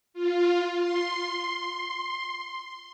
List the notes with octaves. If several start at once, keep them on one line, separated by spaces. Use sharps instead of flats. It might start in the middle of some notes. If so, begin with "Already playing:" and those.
F4
C6